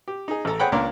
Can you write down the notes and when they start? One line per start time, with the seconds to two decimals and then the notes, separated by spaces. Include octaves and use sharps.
0.08 G4
0.28 D#4 G#4
0.45 A1 A4 A#5
0.59 G#4 C5 C#5 F#5 G5 B5
0.72 C#2 A#3 D4 C#5 C6 D6